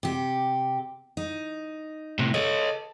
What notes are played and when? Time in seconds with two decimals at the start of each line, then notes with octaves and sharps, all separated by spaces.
0.03 C3 G4
1.17 D#4
2.19 A2 C3
2.34 A4 C#5 D#5